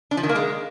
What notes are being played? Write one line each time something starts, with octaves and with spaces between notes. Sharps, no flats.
D4
F3
D#3
A#3
G#3